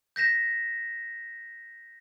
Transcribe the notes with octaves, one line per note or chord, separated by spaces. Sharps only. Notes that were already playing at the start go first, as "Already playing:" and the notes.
G6 A#6 B6 E7